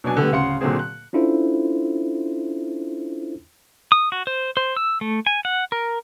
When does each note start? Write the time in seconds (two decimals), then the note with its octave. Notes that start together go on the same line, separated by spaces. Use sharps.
0.04 B2 F#3 D4 G#5
0.17 D3 G3 A3 B3
0.31 D1 C#3 F5 F#5 C6 C#7
0.61 A#2 D3 F#3 A#3 C4 G#4
0.79 F#6
1.13 C#4 D4 E4 F4 A4 C5
3.92 D#6
4.12 F#4
4.27 C5
4.57 C5
4.77 E6
5.01 A3
5.26 G#5
5.45 F#5
5.72 A#4